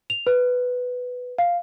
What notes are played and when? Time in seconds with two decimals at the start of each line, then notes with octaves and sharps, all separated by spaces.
0.10 F7
0.27 B4
1.38 F5